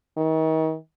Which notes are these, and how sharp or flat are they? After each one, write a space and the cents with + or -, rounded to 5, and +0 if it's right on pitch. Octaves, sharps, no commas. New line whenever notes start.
D#3 +35